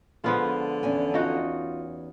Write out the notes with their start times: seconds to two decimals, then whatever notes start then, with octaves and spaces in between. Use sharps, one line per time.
0.24 D3 F3 G#3 B3 F4
0.83 E2 C#4 G#5
1.14 D#4 F4 F#4